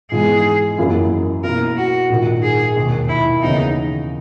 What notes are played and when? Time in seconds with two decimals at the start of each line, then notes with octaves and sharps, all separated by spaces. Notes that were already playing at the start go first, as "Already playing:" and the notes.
0.12 G#2 E3 G#3 B3 G#4
0.78 F#2 E3 A#3 E4 G#4
1.44 B2 A#3 E4 A#4
1.77 F#4
2.10 A#1 G#2 D#3
2.43 G#4
2.76 E1 D#2 D#3
3.09 E4
3.42 D#2 C#3 E3 B3 D#4